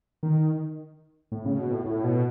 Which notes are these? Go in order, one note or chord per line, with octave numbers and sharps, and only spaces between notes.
D#3
A2
C#3
B2
A2
A2
B2